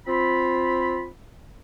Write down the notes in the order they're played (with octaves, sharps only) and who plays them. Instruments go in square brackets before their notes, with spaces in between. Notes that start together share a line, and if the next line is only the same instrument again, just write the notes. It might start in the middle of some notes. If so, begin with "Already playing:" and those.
[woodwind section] C4 F4 B5